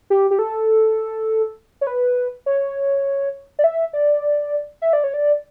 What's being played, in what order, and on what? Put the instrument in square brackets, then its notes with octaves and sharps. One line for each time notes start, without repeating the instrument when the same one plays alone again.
[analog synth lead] G4
G4
A4
C#5
B4
C#5
D5
E5
D5
E5
D5
C#5
D5